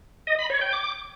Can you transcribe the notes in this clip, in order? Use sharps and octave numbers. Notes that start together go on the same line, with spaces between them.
D#5
B5
C#5
G5
D6